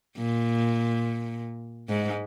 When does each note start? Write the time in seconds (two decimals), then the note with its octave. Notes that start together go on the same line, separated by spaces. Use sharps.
0.17 A#2
1.89 G#2